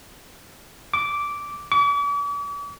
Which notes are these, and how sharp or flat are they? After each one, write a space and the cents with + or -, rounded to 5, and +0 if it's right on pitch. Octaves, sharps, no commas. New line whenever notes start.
D6 -10
D6 -45